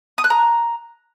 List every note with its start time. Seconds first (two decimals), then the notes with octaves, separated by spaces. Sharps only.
0.18 D#6
0.24 F#6
0.30 A#5